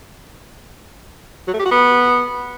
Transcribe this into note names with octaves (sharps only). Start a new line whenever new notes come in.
F#3
A3
G4
F#4
B3